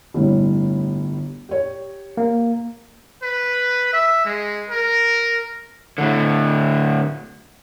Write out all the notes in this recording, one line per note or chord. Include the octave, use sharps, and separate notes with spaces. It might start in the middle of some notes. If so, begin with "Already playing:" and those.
G1 A2 G3
G4 C#5
A#3
B4
E5
G#3
A#4
A2 D3